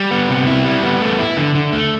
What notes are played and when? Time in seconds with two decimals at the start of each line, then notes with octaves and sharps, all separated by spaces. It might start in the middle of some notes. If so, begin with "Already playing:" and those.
Already playing: G3
0.11 B3
0.29 C3
0.47 E4
0.65 G3
0.83 B3
1.01 A3
1.19 E4
1.37 D3
1.55 D3
1.73 A3